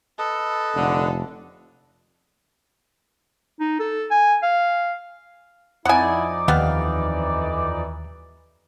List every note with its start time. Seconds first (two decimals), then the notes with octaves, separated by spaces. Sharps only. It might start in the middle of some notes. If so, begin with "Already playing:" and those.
0.19 A4 B4 D#5
0.75 F1 D3
3.60 D#4
3.80 A4
4.11 G#5
4.42 F5
5.85 F2 D#4 E4 D5 F#5 G#5
6.48 D#2 E3 G3 B3 F5